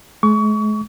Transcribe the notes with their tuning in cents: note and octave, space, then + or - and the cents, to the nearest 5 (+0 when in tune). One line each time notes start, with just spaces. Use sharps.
G#3 +40 C#6 +30